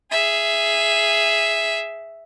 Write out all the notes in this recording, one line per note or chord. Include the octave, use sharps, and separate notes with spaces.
G#4 E5